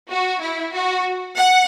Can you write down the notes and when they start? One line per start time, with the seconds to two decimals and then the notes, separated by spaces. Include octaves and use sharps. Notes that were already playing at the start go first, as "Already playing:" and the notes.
0.10 F#4
0.41 E4
0.73 F#4
1.37 F#5